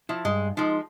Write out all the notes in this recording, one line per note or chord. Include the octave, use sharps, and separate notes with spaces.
F3 E4
G2 G#3
F3 G#3 D#4